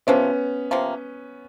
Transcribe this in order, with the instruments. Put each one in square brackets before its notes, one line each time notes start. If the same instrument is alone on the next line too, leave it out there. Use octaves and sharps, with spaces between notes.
[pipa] C3 F3 A#3 [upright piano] B3 C#4
[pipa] C3 F3 A#3